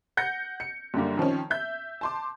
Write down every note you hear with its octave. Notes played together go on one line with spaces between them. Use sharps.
F#5 G6 A#6 C#7
C#7
F#2 D3 G3 A#3
D#3 F3 C4 C#4
E5 G6
A5 C6 D6